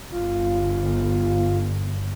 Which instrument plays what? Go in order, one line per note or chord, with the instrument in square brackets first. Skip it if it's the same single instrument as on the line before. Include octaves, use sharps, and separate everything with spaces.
[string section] G1 [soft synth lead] F4